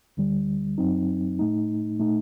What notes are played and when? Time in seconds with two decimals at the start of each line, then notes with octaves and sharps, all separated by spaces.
0.17 D2 D3 G3
0.78 F#2 F#3 C4 D#4
1.39 A2 A3 D#4
2.00 A#2 A3 D#4